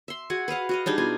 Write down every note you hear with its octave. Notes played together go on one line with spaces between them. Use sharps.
E5 C6
F#4 G#4 F#5 G#5
B4 D#5 F5 F#5
F#4 D#5 F5
G3 D4 D#4 G#4
B2 F4 G#5